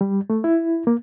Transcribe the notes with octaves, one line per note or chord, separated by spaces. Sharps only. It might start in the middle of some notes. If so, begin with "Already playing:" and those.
G3
A3
E4
A#3